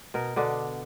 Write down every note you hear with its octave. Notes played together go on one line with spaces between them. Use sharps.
B2 A#4
B2 D3 D4